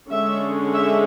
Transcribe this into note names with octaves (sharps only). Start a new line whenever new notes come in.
D3 G#3 C#4 E5
E5